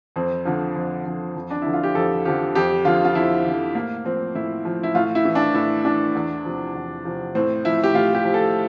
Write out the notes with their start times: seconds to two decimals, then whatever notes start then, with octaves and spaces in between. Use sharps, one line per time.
0.16 F2 C4
0.45 D3 F3
0.76 F2
1.05 D3 F3
1.36 F2
1.50 D4
1.62 D3 F3 E4
1.73 F4
1.83 G4
1.95 F2 A4
2.25 D3 F3 G4
2.55 F2 G4
2.85 D3 F3 F4
3.05 F4
3.15 F2 E4
3.45 D3 F3
3.75 A2 A#3
4.05 F3 C4
4.35 A2 E4
4.65 F3
4.83 E4
4.95 A2 F4
5.15 E4
5.25 E3
5.35 D4
5.54 A2 E4
5.85 E3 D4
6.15 E2
6.45 C3 F3
6.75 E2
7.05 C3 F3
7.35 A2 C4
7.65 F3 E4
7.84 G4
7.94 A2 F4
8.15 G4
8.25 F3
8.34 A4